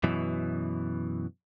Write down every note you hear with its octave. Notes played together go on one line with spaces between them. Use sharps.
F#2 B2 E3